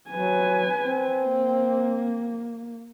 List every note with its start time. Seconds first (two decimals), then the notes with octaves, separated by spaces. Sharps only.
0.11 F#3 B4 G#5
0.83 C4
1.24 A#3